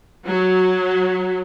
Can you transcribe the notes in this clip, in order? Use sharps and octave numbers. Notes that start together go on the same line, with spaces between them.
F#3